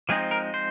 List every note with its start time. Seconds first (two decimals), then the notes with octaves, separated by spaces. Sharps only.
0.09 F3 G#3 C4 D#4 G#4
0.31 A#4
0.54 C5